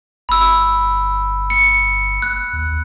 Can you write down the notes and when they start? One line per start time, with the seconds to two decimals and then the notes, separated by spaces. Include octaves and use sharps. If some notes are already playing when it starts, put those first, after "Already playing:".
0.29 G1 B5 E6
1.50 C#7
2.22 F#6
2.53 D#2